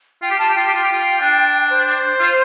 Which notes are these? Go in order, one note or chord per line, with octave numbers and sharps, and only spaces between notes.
F4 G5
G4
F4 A5
G4
F4 G5
G4
F4
G4
F4
D4
C5
F4